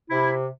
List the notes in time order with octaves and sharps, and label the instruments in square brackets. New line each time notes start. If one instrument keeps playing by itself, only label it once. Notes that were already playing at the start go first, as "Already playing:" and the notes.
[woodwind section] C3 E4